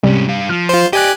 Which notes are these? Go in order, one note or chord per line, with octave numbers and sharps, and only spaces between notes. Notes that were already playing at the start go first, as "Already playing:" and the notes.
G#2 C3 G3 C#4
G2 F5
F3 F6
F4 C5
G4 D5 D#5 G#5 F#6